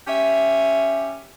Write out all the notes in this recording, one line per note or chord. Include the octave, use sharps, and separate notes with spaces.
C#4 G4 E5